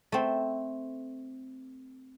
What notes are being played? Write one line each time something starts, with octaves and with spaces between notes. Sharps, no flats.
A3 C4